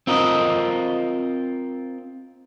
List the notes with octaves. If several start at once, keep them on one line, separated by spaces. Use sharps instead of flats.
C4 F4 A#4 D#5